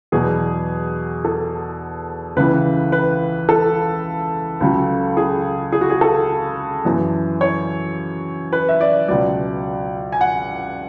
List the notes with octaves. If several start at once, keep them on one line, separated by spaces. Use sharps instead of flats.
E2 B2 F#3 G#4
A4
C#2 C#3 E3 B4
B4
A4
C#2 C#3 F#3
G#4
G#4
F#4
G#4
A4
F#2 E3
C#5
B4
E5
D5
C#2 B2 F#3 D5
G#5
F#5